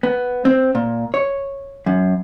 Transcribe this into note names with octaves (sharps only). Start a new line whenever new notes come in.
B3
C4
A#2
C#5
F#2